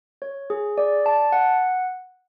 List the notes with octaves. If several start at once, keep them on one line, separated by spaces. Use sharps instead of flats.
C#5
G#4
D5
A5
F#5